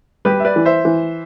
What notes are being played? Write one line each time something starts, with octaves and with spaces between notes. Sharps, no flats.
G3 G4 B4
E5
B4 D5
E3
C5 E5
E3